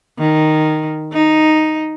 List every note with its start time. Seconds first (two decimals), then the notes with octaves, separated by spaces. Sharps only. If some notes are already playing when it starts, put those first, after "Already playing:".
0.19 D#3
1.13 D#4